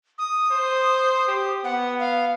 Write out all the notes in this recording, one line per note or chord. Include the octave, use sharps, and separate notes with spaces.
D#6
C5
G4
B3 F#5
F5